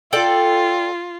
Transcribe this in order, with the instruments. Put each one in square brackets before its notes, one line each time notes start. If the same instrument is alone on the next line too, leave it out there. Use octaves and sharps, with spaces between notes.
[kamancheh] F4 [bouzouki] A4 D5 G5